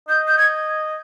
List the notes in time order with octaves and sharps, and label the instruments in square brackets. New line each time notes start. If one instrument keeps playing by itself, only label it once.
[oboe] D#5 [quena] G6
[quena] G6
G#6